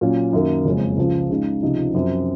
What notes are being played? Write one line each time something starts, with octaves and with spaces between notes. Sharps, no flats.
A#2 F#3 C#4
F#2 D#3 A#3
F#1 F2 C#3 G#3 C#4
C#2 C#3 F3
C#3 G#3 D#4
C#2 C3 F3 C4 D#4
F#2 F3 C4